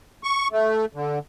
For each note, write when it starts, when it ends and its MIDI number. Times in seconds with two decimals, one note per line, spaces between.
0.24 0.48 85
0.52 0.85 57
0.94 1.19 50